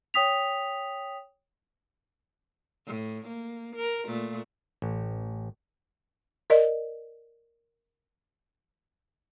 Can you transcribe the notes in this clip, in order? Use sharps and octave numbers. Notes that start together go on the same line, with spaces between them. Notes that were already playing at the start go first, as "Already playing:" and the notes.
C#5 G5 D#6 B6 F7
A2
A#3
A#4
A#2 A3
A1
A#4 D5 D#5